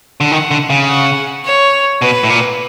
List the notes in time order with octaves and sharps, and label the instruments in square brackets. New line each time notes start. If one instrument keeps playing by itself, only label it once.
[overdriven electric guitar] D3
[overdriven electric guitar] D#3 [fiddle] F#5
[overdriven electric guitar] D3
C#3
[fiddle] F#5
C#5
[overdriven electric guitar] B2 [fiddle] B4
[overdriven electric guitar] A2
A#2